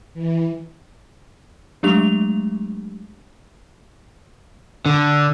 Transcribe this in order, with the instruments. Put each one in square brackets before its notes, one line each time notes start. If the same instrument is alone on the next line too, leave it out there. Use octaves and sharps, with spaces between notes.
[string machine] E3
[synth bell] F#3 G#3 A3 D4 G4 F7
[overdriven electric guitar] D3